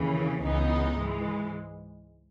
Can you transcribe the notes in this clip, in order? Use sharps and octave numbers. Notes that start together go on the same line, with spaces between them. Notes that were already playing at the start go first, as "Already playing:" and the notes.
Already playing: D#2 C#3 E3
C#2 C#3 E3 B3 D#4
G#2 E3 G#3